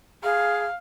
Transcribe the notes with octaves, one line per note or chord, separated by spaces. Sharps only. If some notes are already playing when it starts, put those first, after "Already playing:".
G#4 F5